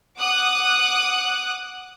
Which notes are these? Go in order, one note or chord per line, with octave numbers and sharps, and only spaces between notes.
F#5 D6 D#6 F#6